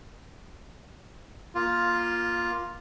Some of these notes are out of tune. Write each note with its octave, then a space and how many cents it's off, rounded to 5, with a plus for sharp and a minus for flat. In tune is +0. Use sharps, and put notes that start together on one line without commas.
A#3 +15 F4 +0